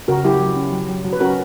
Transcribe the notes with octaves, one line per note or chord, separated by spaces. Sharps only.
C#3 F#4 A#4
F#3 E4 G4
F#3
C#4
F#3
F#3
F#3
B4
C#4 F#4 A#4